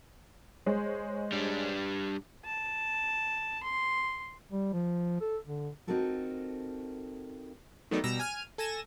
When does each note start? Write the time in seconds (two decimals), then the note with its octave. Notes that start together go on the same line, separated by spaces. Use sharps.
0.66 G#3 C5 C#5
1.32 G3 D4
2.45 A5
3.63 C6
4.52 G3
4.73 F3
5.21 A4
5.46 D3
5.87 C4 D#4 F4 F#4 A4 A#4
7.91 D#3 F#3 A3 B3 D#4 D5
8.04 B2 G3 A#5 E6 A#6
8.19 G#5 F6 D#7
8.58 A4 G#5 G#6 A#6 E7